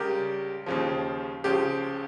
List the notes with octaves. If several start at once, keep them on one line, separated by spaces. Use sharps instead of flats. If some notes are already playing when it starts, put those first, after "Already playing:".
Already playing: C#2 C#3 G3 G4 A#4
D#2 C#3 F3
C#2 C#3 F3 G4